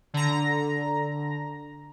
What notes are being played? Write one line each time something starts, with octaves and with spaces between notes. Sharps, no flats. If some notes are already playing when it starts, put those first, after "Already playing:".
D3 A#5